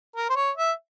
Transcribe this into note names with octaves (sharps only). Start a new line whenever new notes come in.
A#4
C5
C#5
E5